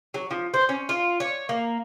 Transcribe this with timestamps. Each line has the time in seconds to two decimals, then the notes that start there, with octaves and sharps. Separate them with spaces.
0.14 F#3
0.31 F3
0.54 C5
0.69 C#4
0.89 F4
1.20 C#5
1.49 A#3